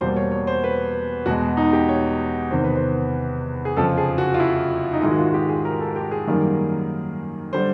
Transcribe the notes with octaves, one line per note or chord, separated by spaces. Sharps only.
E2 B2 G3 A#3 C5
C#5
C#5
C5
B4
E2 B2 G#3 F#4
D#4
G4
C#5
E2 C3 D#3 C5
B4
C5
G#4
F2 C#3 F3 A4
G#4
F#4
F4
E4
D#4
G#2 D#3 G#3 E4
F#4
F4
G4
G#4
A#4
A4
G4
G#4
F#2 D#3 G3 A#3
D3 G3 C5